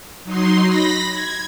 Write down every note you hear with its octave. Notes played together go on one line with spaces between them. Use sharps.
F#3 D#4 C6
B5 A#6 B6
G#6